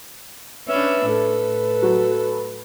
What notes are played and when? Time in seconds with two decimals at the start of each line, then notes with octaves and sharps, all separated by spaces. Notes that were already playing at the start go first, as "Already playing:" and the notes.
0.69 C#4 D4 B4 E5
1.08 A2 A4
1.82 F#3